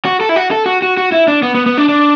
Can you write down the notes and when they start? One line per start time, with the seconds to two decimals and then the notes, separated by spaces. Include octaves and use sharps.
0.05 F#4
0.21 A4
0.29 E4
0.36 F#4
0.51 A4
0.66 F#4
0.82 F#4
0.97 F#4
1.12 E4
1.28 D4
1.43 B3
1.55 B3
1.66 B3
1.77 D4
1.89 D4